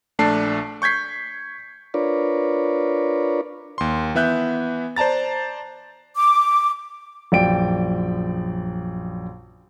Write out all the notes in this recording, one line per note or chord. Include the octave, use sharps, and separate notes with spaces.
A#1 A3 D4 A5 C7
C#6 G6 G#6 B6 C7
D4 F4 A#4 B4 C#5 D5
D#2 C6
E3 B3 E5 F#6 G6
C5 D5 A5 A#5 A6
D6
A#1 F#2 D5 G5 D7